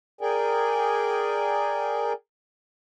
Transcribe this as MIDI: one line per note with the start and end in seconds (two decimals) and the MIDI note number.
0.21 2.13 68
0.21 2.13 70
0.21 2.13 74
0.21 2.13 79
0.21 2.13 80